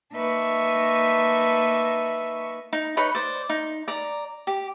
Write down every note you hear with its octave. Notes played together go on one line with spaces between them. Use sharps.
A#3 D#4 B4 E5 A5 C#6
D#4
D#4 B4 C#5 B5
C5 D5
D#4
D5 A#5
G4